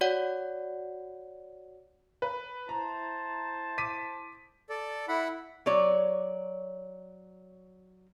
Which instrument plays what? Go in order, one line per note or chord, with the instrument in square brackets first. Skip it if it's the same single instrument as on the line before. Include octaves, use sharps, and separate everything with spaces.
[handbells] F#4 C#5 D5 F#5
[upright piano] B4
[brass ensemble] E4 C5 A5 [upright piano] A#5
[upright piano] D6 B6 D#7
[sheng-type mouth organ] A4 D5
E4 F#5 B5
[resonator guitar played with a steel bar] F#3 C#5 D5